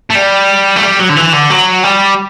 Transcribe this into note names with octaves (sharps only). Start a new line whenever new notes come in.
A3
G3
A3
G3
F#3
D3
E3
D3
F#3
G3